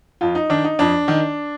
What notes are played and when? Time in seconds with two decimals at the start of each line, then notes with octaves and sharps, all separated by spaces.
0.21 F2 F4
0.35 D#4
0.50 D#3 D4
0.64 D#4
0.79 F2 D4
1.08 D#3